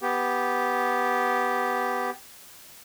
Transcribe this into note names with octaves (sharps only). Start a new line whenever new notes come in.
B3 G4